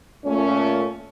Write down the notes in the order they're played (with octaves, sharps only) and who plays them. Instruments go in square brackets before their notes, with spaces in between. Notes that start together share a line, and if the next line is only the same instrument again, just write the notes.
[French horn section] A#2 A3 C#4